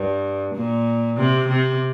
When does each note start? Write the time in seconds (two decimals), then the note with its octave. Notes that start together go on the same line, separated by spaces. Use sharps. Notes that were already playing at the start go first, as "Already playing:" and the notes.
Already playing: G2
0.55 A#2
1.17 C3
1.48 C3